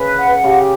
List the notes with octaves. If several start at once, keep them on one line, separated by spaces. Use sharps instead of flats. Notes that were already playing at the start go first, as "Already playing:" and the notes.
Already playing: C#3 B4
F#5
C#3 G4